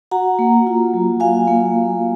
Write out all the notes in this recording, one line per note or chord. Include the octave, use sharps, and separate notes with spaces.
F#4 F#5 A#5
A#3
F4
F#3
F#4 F5 G#5
A#3